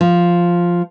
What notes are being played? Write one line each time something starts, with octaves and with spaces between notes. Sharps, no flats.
F3